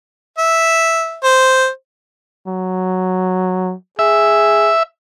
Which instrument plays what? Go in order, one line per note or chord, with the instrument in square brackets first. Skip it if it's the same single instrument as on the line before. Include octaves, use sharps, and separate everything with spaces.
[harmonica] E5
C5
[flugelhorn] F#3
[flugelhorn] G#4 [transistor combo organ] E5